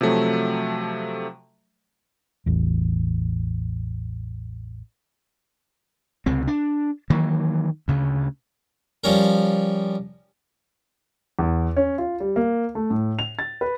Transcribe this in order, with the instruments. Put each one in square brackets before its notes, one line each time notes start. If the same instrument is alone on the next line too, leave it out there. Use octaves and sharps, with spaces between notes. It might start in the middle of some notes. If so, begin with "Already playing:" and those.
[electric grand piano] C3 F3 F#3 A3
[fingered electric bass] A1 E2
[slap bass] C#2 C3 C4
D4
D#3 E3 F#3 A#3
D2 C#3
[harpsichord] F3 G3 C#4 A#4
[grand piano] E2
C#4
F4
G3
A#3
A3
A2
F7
A6
B4